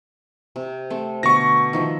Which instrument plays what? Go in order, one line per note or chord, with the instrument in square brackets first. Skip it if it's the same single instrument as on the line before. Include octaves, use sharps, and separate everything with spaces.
[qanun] C3
A3 C4
[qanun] B2 D3 A5 [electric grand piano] C#6 A#6
[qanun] D#3 F3 E5